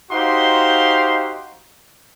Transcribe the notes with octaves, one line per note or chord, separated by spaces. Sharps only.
D#4 F#4 G4 C5 F5 C6